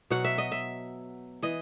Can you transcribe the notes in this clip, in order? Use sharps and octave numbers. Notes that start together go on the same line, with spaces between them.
B2 F#3 F#5
E5
D#5
E5
E3 D#5